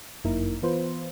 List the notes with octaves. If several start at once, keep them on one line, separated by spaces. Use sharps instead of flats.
G1 F#2 A#3 D#4 E4 A#4
E3 B3 F4 B4 C5